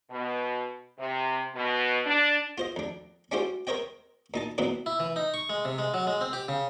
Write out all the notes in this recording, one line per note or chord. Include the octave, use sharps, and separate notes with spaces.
B2
C3
B2
D4
F4 C5 D#5
F2 D4
C#4 D4 E4 F#4 G4 C5
A#4 C5 C#5 D#5 G5
A#2 D#4 A5
B1 A#2 F#3 C4 E4 B4
E4
E3
D#4
C#6
G#3
C3
G#3
F#3
G#3
C4
G4
C#3